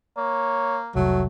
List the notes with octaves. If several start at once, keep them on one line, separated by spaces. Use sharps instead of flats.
A#3 C#5
F1 C2 F#3 A3